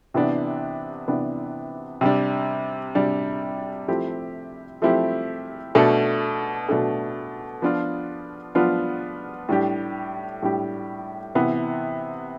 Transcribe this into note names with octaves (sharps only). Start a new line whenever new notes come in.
C3 E3 B3 D4
C3 E3 B3 D4
C3 G3 D4
C3 G3 D4
F3 A3 C4 E4 G4
F3 A3 C4 E4 G4
B2 A3 D4 A4
B2 A3 D4 A4
F3 B3 D4 F4
F3 B3 D4 F4
A2 G3 D4 G4
A2 G3 D4 G4
C3 E3 B3